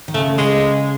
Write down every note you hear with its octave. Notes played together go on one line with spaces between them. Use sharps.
D#3
C#3 A3
G#3